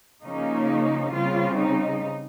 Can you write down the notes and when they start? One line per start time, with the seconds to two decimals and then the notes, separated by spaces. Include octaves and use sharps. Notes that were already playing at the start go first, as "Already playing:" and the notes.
0.23 C#3 F3 A#3 C#4 D#4
1.13 C#3 G3 C4 F4
1.57 D#4